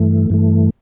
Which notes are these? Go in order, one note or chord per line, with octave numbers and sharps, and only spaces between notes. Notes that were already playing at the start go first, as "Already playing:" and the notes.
Already playing: G2 E3 A3
G2 E3 A3